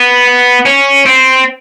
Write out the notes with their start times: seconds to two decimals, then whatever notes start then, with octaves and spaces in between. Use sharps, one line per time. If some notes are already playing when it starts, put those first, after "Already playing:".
Already playing: B3
0.66 C#4
1.06 C4